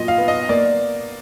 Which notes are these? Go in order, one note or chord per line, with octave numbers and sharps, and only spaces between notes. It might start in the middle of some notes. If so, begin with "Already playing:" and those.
Already playing: A#2 F#3 D#5
F5
B3
D#5
A#3 D5